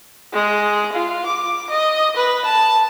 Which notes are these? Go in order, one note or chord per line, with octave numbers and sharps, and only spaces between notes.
G#3
F4
D6
D#5
B4
A5